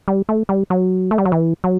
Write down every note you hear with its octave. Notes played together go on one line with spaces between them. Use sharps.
G3
A3
G3
F#3
A3
G3
F#3
E3
F#3